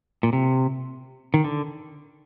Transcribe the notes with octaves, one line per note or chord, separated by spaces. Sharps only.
A#2
C3
D#3
D3